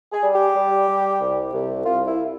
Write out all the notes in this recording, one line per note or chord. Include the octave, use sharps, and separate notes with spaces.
G#4
G3
G4
G3
G3
C2
C2
C2 F4
E4